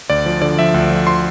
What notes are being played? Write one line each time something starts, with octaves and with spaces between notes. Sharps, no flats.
D2 D5
F3
D3 D5
F3 E5
D2
F3
C6